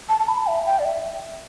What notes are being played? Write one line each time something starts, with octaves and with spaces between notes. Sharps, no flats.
A5
A5
B5
A5
E5
G5
D5
E5